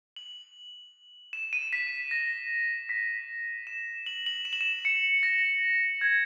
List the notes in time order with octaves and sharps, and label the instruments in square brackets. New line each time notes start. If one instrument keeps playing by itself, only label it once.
[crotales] F#7
E7
D#7
B6
A#6
B6
E7
F#7
F#7
E7
F#7
E7
C#7
A#6
G#6